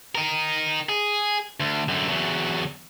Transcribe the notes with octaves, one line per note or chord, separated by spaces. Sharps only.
D#4 A#4
G#4
D2
F#2 D3
E2 F#3